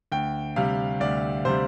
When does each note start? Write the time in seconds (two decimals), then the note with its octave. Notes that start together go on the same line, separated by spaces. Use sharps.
0.12 D2 G5
0.56 C3 G3 F5
1.00 D2 D5
1.45 C3 G3 C5